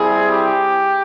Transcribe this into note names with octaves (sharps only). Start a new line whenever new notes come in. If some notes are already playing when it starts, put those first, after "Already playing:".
Already playing: G3 C4 E4 G#4
G4